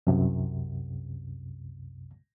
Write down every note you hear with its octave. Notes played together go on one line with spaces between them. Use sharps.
C2 F#2 C3